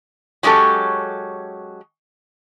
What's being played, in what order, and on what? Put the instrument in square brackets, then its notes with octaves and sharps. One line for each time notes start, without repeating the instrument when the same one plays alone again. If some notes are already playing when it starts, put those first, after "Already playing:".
[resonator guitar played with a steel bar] F#3 G#3 C#4 G4 A4